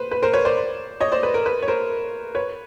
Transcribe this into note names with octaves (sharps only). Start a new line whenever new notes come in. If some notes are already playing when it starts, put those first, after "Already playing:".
Already playing: B4 C5
B4
A#4 C5
B4 C#5
C5 D5
C#5 D#5
C5 D5
B4
A#4
B4
C#5
A#4 C5
B4 C#5